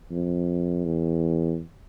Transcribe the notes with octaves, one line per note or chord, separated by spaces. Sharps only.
F2
E2